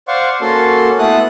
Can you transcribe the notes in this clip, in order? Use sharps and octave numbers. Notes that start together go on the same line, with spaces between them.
C5 D5 F5 F#5 C6 C#6
A#3 C#4 F#4 A4 C6
A3 B3 E4 A4 D#6 F#6